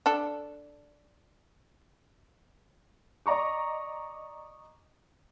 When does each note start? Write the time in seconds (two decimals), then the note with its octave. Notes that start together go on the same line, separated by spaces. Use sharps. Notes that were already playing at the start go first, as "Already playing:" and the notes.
0.06 D4 A4
3.26 D5 D#5 A#5 C#6 D6